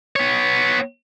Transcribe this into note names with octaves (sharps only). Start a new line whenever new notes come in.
B3 C#5